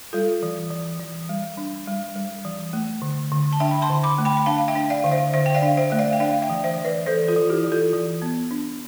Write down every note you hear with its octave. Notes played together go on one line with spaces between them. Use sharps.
G3 F4 A4
E3
E3
E3
G3
D4
G3
G3
E3
A3
D3
D3
A5
D4 E5 G5
B5
A5 C6
D3
B5 D6
A3
G5 B5
B5
D4 F5 A5
E5 G5
D4
D5 F5
D3 F5
C5 E5
D3 C5 E5
G5
D5 F5
D4
C5 E5
A3 E5
D5 F5
G5
D4 D5 F5
E5 G5
E3
C5 E5
E3
B4 D5
E3 A4 C5
F4 A4
E3
E4 G4
E3
F4 A4
E3
B3
D4